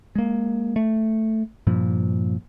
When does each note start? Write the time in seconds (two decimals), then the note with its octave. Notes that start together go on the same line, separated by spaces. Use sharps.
0.16 G#3 A#3
0.76 A3
1.67 G2 A#2 F3